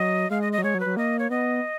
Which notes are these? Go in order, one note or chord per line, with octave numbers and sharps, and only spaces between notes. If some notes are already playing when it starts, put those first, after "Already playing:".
Already playing: F#3 D#5
G#3 F5
D#5
D#5
F#3
G#3 C#5
F#3
B4
F#3
A#3 D#5
C#5
B3 D#5